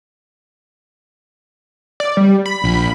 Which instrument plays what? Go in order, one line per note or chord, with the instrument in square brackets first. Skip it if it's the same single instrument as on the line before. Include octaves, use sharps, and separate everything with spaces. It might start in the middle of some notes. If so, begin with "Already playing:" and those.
[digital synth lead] D5
G3
B5
[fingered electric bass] A#1